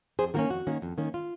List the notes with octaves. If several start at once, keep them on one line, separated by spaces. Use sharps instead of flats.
F2 G#4 C5
D#3 A#3 C#4 F#4 A#4
F2 F#4
D#3 A#3 C#4
F2
D#3 A#3 C#4
F4